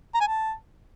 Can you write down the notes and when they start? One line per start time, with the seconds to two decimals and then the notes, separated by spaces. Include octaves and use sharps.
0.15 A#5
0.21 G#5
0.28 A5